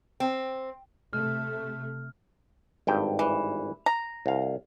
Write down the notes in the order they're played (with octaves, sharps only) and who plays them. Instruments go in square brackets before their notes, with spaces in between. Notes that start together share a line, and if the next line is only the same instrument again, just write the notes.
[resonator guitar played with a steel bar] C4
[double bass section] C3 A3 [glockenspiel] F6
[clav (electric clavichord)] G#1 G2 G5
[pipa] E3
A#5
[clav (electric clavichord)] C2 F5